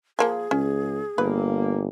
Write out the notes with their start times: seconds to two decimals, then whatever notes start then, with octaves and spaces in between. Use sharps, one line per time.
0.19 F3 A#3 G#4 G#5
0.51 C#2 C#4
1.18 G1 A#3 B4